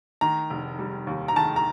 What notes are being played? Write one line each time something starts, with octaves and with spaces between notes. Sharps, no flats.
D#3 A#5
F1
G3
D#2
A#5
D#3 A5
A#5